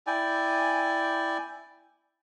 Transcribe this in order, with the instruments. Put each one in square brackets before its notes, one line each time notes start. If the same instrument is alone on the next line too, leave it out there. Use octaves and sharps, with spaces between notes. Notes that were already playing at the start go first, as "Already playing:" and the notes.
[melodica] E4 D5 G5 G#5